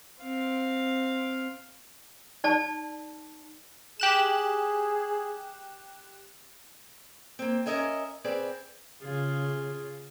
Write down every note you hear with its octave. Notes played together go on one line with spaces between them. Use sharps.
C4 F5
D#4 D5 A5
G4 G#4 F#6 E7
A#3 C4
C#4 A#4 D#5 E5 G#5
C4 G#4 B4 D5
C#3 F4 G#4